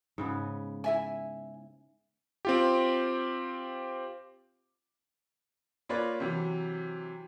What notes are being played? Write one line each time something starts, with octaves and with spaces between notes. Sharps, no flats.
G#2 C#3 B3
E4 E5 G#5
C4 F4 G4
A#3 F4 B4 C#5 D5
C3 E3 F#3